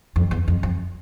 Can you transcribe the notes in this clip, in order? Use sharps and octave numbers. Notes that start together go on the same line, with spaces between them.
F2
E2
F2
F2